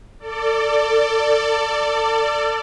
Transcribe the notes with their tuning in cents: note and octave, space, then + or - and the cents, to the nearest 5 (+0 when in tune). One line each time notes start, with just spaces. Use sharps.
A4 +30 D5 +0